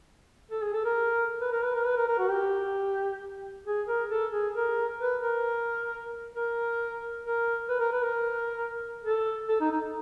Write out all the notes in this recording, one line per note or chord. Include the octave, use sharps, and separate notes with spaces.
A4
G#4
A4
A#4
B4
A#4
B4
A#4
B4
A#4
A#4
F#4
G4
G#4
A#4
A4
G#4
A#4
B4
A#4
A#4
A#4
B4
A#4
B4
A#4
A4
A4
D#4
D#4